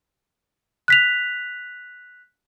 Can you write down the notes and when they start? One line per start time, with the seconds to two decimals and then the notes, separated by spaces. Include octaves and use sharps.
0.88 F#6 B6 F7